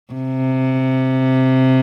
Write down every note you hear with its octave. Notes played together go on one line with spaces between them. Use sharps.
C3